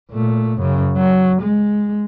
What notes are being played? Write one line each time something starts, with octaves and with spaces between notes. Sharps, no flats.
A#2 A3
F#2 C#3
F#3
G#3